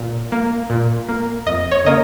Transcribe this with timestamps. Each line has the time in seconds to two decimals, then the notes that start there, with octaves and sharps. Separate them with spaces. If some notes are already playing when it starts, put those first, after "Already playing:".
Already playing: A#2
0.32 A#3
0.70 A#2
1.08 A#3
1.46 F2 D#5
1.71 C#5
1.85 C#3 A#3 D#5